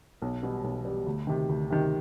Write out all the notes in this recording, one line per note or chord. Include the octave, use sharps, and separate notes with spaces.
B1
B2 G3
B1
B2 G3
D2
C3 D#3
D2
C3 D#3